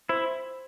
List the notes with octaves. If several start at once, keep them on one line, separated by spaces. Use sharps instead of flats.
E4 C5